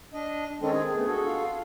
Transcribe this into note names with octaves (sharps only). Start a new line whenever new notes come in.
D4 D#5
D#3 G#3 C4 C#4 D#4 A4
D4 G#4
A3 B3
F#4 A4
F4 F5